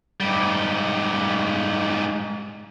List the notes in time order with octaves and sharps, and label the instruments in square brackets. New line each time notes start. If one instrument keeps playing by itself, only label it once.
[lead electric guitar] G#2 G3